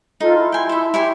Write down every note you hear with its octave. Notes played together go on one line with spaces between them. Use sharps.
D#4 F4 A4
E4 C6
G5 G#5
A4 E5
E4 G4 C#5 G#5 C6